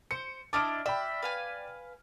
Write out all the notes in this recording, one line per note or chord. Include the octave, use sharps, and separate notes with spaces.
C5 C#7
D4 E4 D#5 D6 F6 D7
D5 E5 G5 B5
B4 F5 G#5